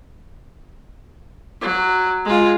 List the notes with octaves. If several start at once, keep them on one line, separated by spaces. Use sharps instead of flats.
F#3
G#3 F4